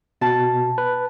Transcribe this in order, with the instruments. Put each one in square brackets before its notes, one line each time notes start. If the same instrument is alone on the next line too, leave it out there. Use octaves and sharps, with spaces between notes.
[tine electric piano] B2 [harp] A5
[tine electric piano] B4